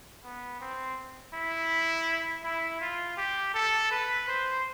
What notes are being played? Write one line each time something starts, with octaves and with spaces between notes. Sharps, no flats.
B3
C4
E4
E4
F4
G4
A4
B4
C5